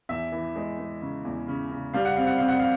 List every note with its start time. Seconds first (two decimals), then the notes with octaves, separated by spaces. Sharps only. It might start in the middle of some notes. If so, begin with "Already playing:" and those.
0.09 E2 E5
0.32 E3
0.56 G#3
0.79 G#3
1.02 C#3
1.25 E2
1.48 C#3
1.71 C#3
1.94 G3 F5
2.05 F#5
2.16 C4 F5
2.27 F#5
2.38 C4 F5
2.48 F#5
2.59 F5